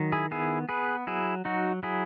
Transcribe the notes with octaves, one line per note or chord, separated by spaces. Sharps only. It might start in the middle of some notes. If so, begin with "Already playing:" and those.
Already playing: D#3 F#3
E4 G#4
B3 E4 G#4
B3 G#4 B4
F#3 E4 G#4
F#3 D#4 F#4
F#3 E4 G#4